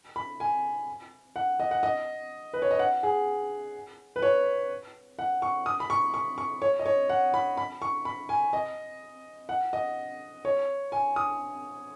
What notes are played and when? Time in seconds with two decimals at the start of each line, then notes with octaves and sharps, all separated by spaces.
0.16 B5
0.40 G#5
1.36 F#5
1.60 D#5
1.71 F#5
1.83 D#5
2.53 B4
2.62 C#5
2.71 D#5
2.79 F#5
3.03 G#4
4.16 B4
4.22 C#5
5.19 F#5
5.42 C#6
5.66 D#6
5.80 B5
5.90 C#6
6.14 C#6
6.38 C#6
6.62 C#5
6.79 D#5
6.86 C#5
7.09 F#5
7.34 B5
7.57 B5
7.82 C#6
8.05 B5
8.29 G#5
8.53 D#5
9.49 F#5
9.73 D#5
10.45 C#5
10.92 G#5
11.16 D#6